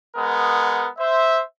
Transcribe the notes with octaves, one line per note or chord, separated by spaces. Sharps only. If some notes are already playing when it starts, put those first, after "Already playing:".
G#3 B3 A#4 F#5
C5 E5